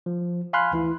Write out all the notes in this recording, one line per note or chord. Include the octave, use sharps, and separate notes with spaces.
F3
F5 G#5 B5 C6 F6 F#6
D2 E3 E4